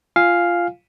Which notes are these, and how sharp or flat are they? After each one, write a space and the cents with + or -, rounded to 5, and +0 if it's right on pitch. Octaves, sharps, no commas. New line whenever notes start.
F4 -15 F5 +0 G#5 -5